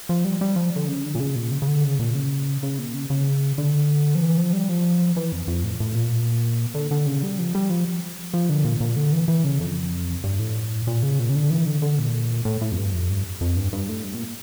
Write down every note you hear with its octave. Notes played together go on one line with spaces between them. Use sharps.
F3
G3
G3
F3
D3
C#3
D3
A#2
C#3
A#2
C#3
C#3
D3
C#3
A#2
C#3
C#3
A#2
C#3
C#3
D3
F3
E3
F3
G3
F3
E3
F2
F2
A2
A2
A#2
D3
D3
C#3
G3
F3
G3
F3
F3
D3
A#2
A#2
D3
E3
E3
C#3
F2
G2
A2
A#2
C#3
A#2
C#3
D3
E3
D3
D3
A#2
A2
A2
F2
G2
F2
G2
F2
G2
G2
A2
G2
A#2